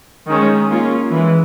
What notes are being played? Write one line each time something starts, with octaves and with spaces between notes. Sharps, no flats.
D#3 G#3 C#4
A#3 C#4 F4
E3 G#3